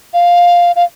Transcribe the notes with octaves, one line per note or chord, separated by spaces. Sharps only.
F5
F5